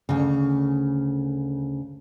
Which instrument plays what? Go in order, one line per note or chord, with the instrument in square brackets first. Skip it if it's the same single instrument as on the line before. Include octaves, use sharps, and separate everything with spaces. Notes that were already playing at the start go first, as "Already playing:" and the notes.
[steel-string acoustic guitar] D2 C#3